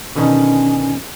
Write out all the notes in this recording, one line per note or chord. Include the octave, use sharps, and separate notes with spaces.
B2 D3 D#3 C#4